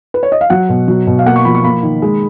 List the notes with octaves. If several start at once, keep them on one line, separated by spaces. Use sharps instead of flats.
B4
C#5
D#5
F5
F#3 F#5
B2
F#3
B2
F5
A#3 F#5
C#6
F3 B5
C#6
A#3 B5
D#3
G#3